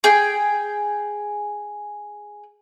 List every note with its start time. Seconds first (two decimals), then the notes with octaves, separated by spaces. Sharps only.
0.04 G#4 G5